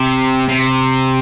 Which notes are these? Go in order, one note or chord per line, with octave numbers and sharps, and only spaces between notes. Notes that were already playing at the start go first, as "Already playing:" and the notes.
Already playing: C3
C3